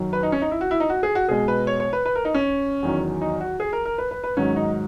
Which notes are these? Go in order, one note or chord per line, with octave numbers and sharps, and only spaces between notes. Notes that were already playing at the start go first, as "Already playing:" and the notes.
Already playing: F#2 D#3 F#3
B4
D#4
C#4
D#4
E4
F#4
E4
D#4
F#4
G#4
F#4
B2 G#3 G#4
B4
C#5
C#5
B4
B4
A#4
D#4
C#4
E2 D#3 F#3
D#4
F#4
G#4
A#4
A#4
B4
B4
B4
G#2 D#3 F#3 C#4
D#4